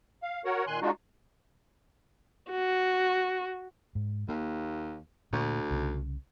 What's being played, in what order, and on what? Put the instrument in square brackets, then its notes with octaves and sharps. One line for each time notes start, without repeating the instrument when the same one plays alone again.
[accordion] F5
F#4 A#4 C#5 F#5
A#2 D#3 G#5 C6 F#6
G#3 D4 D#4 F4 F#4
[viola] F#4
[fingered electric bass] G#2
[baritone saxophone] D#2 [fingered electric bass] A#3
[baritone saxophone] D2 [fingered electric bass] A#2 D3
[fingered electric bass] C2 C#3